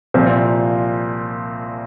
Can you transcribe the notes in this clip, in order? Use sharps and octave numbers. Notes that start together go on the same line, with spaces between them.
C2 A#2 F3 C4